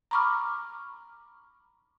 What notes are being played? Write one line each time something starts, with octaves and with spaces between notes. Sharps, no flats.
A#5 B5 C#6 D6 F6